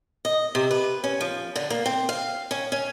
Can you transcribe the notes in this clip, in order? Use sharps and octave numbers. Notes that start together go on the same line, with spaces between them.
D#5
C3
B4
C#4
F3
D3
A#3
C4
F5
C#4
C#4